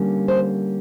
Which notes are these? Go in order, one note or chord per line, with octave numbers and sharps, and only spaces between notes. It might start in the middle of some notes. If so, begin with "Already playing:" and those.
Already playing: D3 G3 A#3 C#4
C5